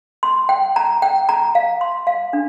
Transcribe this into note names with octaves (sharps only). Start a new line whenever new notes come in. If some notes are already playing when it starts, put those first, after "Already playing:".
C6
G5
A#5
G5
A#5
F5
C6
F5
D4